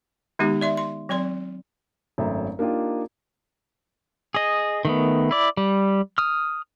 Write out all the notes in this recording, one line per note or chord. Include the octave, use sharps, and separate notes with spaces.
D#3 G#3 B3 D#4 G4
D5 E5 C6
C6
F#3 C4 D5 C6
G#1 F#2 F#3 A3 E5 A#5
A#3 D4 D#4 F4 G4
G#4 D#5
D#3 A3 B3
E4 D5
G3
D#6 F6